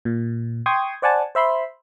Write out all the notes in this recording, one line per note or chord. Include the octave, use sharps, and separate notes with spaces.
A#2
G5 C6 C#6 D#6 G#6
C5 D5 F#5 G#5 A5
C5 E5 B5 C6